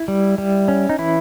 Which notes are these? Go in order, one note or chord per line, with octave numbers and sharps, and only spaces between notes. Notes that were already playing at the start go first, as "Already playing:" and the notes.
Already playing: E4
G3
G3
C#4
D#4
E3 E4